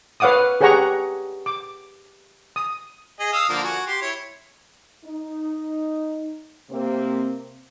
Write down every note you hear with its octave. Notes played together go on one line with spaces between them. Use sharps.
B4 C#5 F5 F#5 D6 D#6
G4 G#4 C#5 F#5 A#5 C#6
D6
D#6
G#4 D#5
F5 D#6 E6
D3 F3 A#3
F#4 G#5
G4 C6
E4 C#5
D#4
C3 A#3 C4